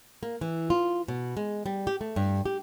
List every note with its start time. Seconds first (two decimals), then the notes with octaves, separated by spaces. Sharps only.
0.23 A#3
0.41 E3
0.70 F4
1.08 B2
1.37 G#3
1.66 G3
1.87 G4
2.01 A3
2.16 G2
2.46 G4